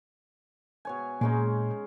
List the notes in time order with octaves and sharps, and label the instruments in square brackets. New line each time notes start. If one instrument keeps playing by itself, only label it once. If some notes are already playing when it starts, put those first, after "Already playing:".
[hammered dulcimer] B2 C#5 G#5
[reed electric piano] A#2 [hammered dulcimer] G#3 C#4 D#4